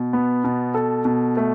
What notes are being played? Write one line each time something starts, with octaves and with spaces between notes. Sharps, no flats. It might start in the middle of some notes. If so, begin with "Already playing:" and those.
Already playing: B2
B3
B2
A4
B2
A3